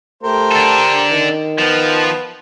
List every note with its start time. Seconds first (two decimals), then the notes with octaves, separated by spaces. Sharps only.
0.23 A3 G4 A#4 C5
0.52 D4 A4
1.11 D#3
1.58 F3 B3